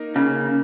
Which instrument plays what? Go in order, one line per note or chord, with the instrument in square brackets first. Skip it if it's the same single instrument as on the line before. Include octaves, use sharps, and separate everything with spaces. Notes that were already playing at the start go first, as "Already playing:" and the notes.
Already playing: [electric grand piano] A#3 D#4 A#4
[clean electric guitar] C#3 [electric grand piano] A#3